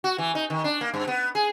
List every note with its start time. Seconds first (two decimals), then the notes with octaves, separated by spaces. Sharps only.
0.04 F#4
0.18 E3
0.35 D#4
0.50 D#3
0.64 D4
0.81 A#3
0.94 G2
1.07 B3
1.35 G#4